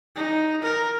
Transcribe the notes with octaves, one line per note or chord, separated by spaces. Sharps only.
D#4
A#4